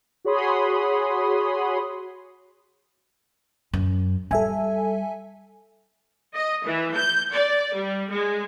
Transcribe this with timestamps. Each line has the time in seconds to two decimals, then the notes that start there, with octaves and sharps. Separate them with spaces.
0.25 F#4 G#4 C#5 B5 C6 D#6
3.73 F#2
4.31 G3 A4 E5 G#5
6.34 D#5
6.66 E3
6.96 G6
7.33 D5
7.76 G3
8.11 G#3